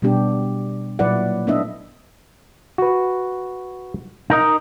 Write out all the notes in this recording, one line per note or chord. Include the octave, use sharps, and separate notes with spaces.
B2 G3 B3 D4 G4
A#2 F#3 E4 B4 D5 F#5
A3 B3 D4 E4 D#5 E5
F#4 B4
D#4 A#4 D#5